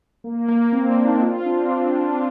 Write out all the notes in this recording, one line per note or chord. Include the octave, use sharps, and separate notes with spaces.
A#3
A#3
C4
D4
D#4
F4
C4
D4
C4
D4
F4